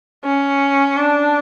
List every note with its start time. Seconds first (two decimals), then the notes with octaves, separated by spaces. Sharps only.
0.25 C#4
0.97 D4